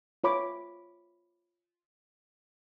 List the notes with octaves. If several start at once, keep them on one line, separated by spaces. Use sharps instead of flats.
F4 C#5 B5 D6